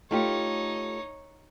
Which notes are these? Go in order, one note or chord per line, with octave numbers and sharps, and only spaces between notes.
A3 D#4 F4 G4 C#5